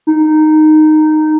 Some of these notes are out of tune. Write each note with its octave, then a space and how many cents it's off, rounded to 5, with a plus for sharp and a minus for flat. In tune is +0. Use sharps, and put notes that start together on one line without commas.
D#4 -10